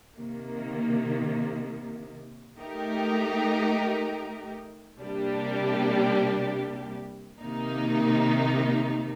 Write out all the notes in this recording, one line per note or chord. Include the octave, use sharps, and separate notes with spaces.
C3 D#3 A#3
A3 D#4 G4 A#4
C3 G3 A#3 D4 G4
C3 D#3 A#3 D#4